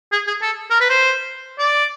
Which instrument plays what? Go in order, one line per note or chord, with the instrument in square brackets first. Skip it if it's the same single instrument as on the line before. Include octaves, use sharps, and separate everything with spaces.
[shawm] G#4
G#4
A4
A#4
B4
C5
D5